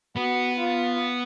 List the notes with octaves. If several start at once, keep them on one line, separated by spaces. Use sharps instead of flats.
B3 F#4
F4